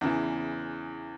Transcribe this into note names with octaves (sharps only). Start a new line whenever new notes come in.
E2 C#3 E3